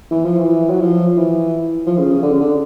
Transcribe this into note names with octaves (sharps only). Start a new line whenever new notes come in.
E3
F3
E3
F#3
F3
E3
F3
C#3
C#3
D3
C#3
D3